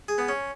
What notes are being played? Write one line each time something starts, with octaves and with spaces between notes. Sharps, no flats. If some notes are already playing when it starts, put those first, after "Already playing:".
G#4
B3
C#4